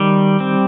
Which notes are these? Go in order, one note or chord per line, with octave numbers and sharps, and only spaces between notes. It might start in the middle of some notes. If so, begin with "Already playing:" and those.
Already playing: D#3 G3
C4